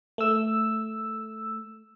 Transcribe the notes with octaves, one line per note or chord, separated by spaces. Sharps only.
A3 E6